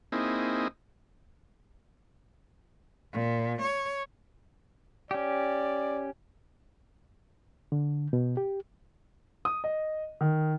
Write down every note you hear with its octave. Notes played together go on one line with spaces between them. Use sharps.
A#3 C4 D#4 E4 G#4
A#2
C#5
C#4 G4 D5
D3
B2
G4
D#6
D#5
D#3